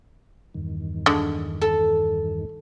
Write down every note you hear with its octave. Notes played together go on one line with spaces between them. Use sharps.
E2 G2 D#3
D3 G#3
A4